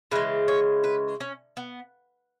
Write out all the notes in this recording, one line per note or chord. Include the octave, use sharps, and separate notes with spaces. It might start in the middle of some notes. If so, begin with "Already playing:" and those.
C#3 E3 G#3 B4
C#5
B4
C#4
B3